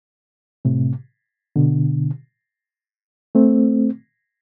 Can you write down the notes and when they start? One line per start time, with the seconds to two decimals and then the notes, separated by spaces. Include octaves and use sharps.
0.65 A2 C3
1.56 B2 D3
3.35 A3 C4